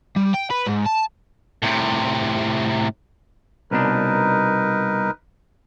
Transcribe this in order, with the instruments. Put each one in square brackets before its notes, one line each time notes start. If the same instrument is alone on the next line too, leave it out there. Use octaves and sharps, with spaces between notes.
[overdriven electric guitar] G3
G5
B4
G#2
A5
A2 C3
[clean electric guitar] C2 B2 D4 [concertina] D#4 A#4 B4